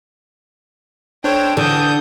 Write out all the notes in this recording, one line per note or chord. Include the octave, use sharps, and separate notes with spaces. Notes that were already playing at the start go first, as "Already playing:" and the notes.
D4 A4 C5 C#5 G5
D3 E3 G5 D#6 G6